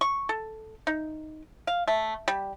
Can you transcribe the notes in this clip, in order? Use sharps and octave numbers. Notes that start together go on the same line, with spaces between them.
C#6
A4
D#4
F5
A3
G3